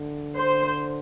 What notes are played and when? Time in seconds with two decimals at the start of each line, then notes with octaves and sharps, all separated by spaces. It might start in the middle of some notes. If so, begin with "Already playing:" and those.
Already playing: D3
0.35 C5